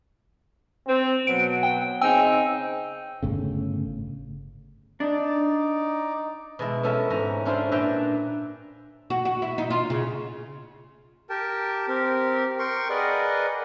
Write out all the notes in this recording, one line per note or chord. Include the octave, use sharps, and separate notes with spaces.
C4
B2 F#3 B3 D7
G5
C#3 C4 D#4 G5 G#5 E6
G1 A2 C#3
D4 D#4 D5
B2 G#3 E4
B3 C#4 E4 A4 A#4 E5
G#2 C#4 A#5
C#4 D4 E4 F4 C5
A#2 D4 B4 E5 G5 A#5
F#4
F#4
E4
D#4
F4
C#3
G4 A#4 G5 A5
C4 G4 A#4
A#4 G5 C6 C#6
G#4 A#4 B4 D5 D#5 F#5